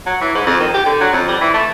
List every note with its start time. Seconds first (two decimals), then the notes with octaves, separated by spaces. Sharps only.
0.06 F#3
0.21 E3
0.35 G#2
0.46 F2
0.60 D#3
0.74 G4
0.86 D3
1.00 F#3
1.13 F2
1.28 G3
1.41 E3
1.54 A3